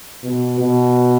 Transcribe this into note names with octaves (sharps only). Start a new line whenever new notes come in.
B2
B2